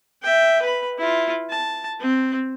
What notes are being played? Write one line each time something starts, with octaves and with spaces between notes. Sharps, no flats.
E5 G5
B4 B5
E4 F4
A5
C4